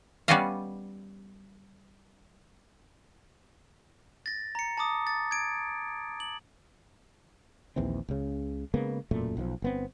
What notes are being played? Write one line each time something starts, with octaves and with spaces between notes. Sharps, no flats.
G3 B3 C#4 D5 D#5 F5
A6 A#6
A#5 C#7
A5 A#5 D6 D#6
A6
G#6 D7
F#7
A#1 D#2 E3 C4
C#2 C#3
C#3 G#3 A#3 B3
E1 F#2 A#2 A3
B1 D#3 F3
G1 B3 C4